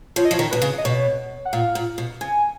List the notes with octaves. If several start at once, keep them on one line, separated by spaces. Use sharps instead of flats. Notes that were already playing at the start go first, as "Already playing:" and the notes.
F3 C#5
D#5
F3
C#5
D#3
B2 B4
C#3
D#5
B2 C#5
F#5
A#2 F5
A#2
B2
C#3 G#5